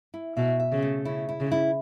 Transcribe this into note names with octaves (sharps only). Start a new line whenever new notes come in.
E4
B2 E5
E5
C#3
A3
C#3 E4
E4
C#3
E4